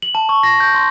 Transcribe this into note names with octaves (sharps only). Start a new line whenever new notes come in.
F#7
A5
C#6
A#6
G6
C6